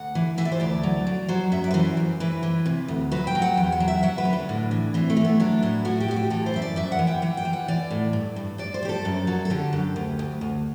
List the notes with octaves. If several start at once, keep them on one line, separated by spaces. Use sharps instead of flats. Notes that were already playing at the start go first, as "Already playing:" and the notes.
Already playing: D2 F#5
E3
E3 E5
D5
C5
D2 D5
F#3
F#3
F#3 C5
F#2 E5
D5
B4
E3 C5
G2
E3 B4
E3
C3
D2
F#3 B4
G5
F#3
F#5
E2 G5
F#5
F#3
E5
F#3 F#5
B4
D3
D4
A2
E3
E3 C4
A3
E3
B3
F#3 D4
A2 E4
A2 F#4
G4
A2 F#4
G4
E3 A4
C5
F#2 E5
D5
F#2 E5
F#5
E3
G5
E3 F#5
G5
E3
F#5
E3 D5
A2
G2
G2
G2 D5
C5
G2 G4
A4
F#2
F#3
A4
D3 G4
F#2
D2
D2
D2